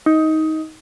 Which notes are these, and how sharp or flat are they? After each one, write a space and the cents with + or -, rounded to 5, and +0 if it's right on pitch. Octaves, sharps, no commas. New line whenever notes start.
D#4 +15